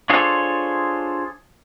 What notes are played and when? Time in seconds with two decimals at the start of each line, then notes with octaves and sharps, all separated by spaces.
0.10 D4 F4 G#4 A4 C5 C#5